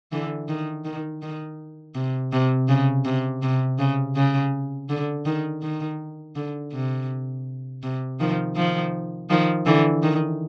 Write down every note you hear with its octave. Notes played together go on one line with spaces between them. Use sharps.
D3 E3
D#3
D#3
D#3
C3
C3
C#3
C3
C3
C#3
C#3
D3
D#3
D#3
D3
C3
C3
D#3 F3
D#3 F3
D#3 F3
D3 E3
D#3